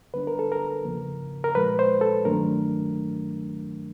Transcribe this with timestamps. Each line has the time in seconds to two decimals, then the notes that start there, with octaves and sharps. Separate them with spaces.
0.14 D3 G3 B3 D4 B4
0.27 A#4
0.39 A4
0.52 A#4
0.85 E2 C#3 F3 A#3
1.44 A#4
1.55 A#2 F3 G#3 B4
1.79 C5
2.01 A4
2.25 G2 D#3 F#3 A3 D4 A#4